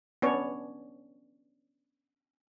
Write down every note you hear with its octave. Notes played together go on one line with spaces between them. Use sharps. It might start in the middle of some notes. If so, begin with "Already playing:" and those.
B3 C#4 D4 C#5